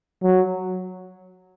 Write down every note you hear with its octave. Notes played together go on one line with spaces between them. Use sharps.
F#3